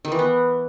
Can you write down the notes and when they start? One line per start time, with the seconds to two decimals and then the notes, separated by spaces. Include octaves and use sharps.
0.05 D#3
0.12 E3
0.19 B3